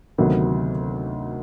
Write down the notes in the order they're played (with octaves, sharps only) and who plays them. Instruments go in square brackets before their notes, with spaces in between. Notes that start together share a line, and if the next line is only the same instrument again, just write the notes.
[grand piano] D2 C3 D#3 F#3 B3